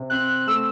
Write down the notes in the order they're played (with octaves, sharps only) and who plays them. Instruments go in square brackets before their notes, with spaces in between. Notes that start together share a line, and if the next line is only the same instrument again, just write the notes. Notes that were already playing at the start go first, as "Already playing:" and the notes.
Already playing: [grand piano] C3
[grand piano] C4 [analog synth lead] F#6
[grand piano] A3 [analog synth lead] E6